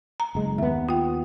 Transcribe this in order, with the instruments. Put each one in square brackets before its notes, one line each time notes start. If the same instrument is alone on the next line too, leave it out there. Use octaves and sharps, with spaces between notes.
[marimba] A#5
[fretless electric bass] F#1 G#3
[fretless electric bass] D#2 B3 [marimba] E5
[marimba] F4 G5